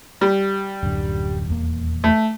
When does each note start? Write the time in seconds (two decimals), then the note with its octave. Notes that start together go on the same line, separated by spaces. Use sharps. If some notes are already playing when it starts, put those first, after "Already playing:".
0.21 G3
0.83 D1 F#2 D3
1.49 D#1 E2 A#3
2.04 A3